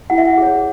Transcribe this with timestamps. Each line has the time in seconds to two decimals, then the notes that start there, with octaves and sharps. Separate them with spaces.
0.10 E4 F#5
0.18 E5
0.25 F#5
0.38 G#4 C#5